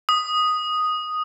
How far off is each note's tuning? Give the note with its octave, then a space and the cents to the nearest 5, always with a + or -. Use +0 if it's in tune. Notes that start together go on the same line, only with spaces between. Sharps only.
D#6 -5